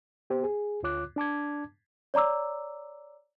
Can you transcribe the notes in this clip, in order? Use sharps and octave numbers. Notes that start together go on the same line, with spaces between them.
B3 G4 C5
G#4
D2 D3 F4 C#5 D6 F#6
D4 A5 D6 G#6
C#5 D5 A#5 D6 E6